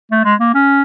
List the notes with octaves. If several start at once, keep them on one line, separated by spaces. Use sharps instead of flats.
A3
G#3
A#3
C#4